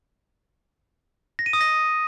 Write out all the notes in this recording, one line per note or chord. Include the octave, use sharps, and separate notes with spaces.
A#6
D#7
D#6
A#6